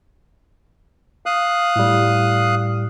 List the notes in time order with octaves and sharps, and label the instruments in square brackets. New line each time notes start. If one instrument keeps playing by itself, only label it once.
[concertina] F5 D#6 F#6
[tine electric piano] A2 G3